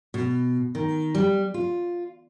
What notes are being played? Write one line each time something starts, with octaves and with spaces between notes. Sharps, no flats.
B2
D#3
G3
F4